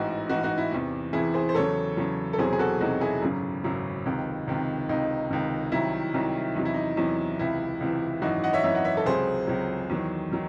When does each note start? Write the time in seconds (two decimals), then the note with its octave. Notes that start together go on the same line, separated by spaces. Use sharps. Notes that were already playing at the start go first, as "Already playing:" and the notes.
Already playing: A1 G#2 E3 D#4 F#4
0.29 A1 G#2 E3 D#4 F#4
0.43 D#4 F#4
0.58 E4
0.72 E2 C3 E3
1.13 E2 C3 E3 E4 G#4
1.34 G#4 C5
1.49 C5
1.55 E2 C#3 F#3 A4 C#5
1.97 E2 C#3 F#3
2.33 A4
2.38 E1 E2 C3 F#3 G#4 C5
2.53 G#4
2.59 F#4 A4
2.80 E1 E2 C3 F#3 D#4 F#4
3.01 E4 G#4
3.22 G#1 F#2 C#3 F#3
3.64 G#1 F#2 C#3 F#3
4.06 C#2 C3 D#3
4.47 C#2 C3 D#3
4.89 C#2 C3 D#3 D#4
5.30 C#2 C3 D#3
5.72 C2 C3 D#3 F#3 E4
6.14 C2 C3 D#3 F#3
6.55 E2 C3 F#3 D#4
6.65 E4
6.74 D#4
6.97 E2 C3 F#3
7.39 C#2 C3 E3 E4
7.80 C#2 C3 E3
8.22 G#1 F#2 E3 D#4 F#4
8.44 D#5 F#5
8.53 C#5 E5
8.64 G#1 F#2 E3 C#5 E5
8.75 D#5 F#5
8.85 C#5 E5
8.97 A4
9.06 C#2 C3 F#3 G#4 C5
9.47 C#2 C3 F#3
9.90 E2 D#3 F#3
10.32 D#3 F#3